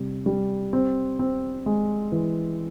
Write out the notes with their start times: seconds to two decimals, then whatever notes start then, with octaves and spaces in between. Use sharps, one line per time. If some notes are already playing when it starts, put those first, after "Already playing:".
Already playing: C3 G3
0.26 G3
0.73 C4
1.19 C4
1.66 G#3
2.12 E3